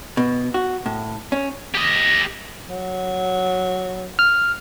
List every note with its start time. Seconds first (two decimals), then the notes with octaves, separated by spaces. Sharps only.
0.17 B2
0.54 F#4
0.86 A2
1.32 C#4
1.75 G4 D#5
2.69 F#3
4.19 F6